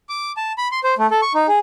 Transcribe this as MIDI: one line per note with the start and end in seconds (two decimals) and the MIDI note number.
0.09 0.32 86
0.37 0.52 81
0.58 0.68 83
0.72 0.80 84
0.84 0.94 72
0.99 1.07 57
1.10 1.21 69
1.22 1.33 85
1.35 1.47 63
1.48 1.59 68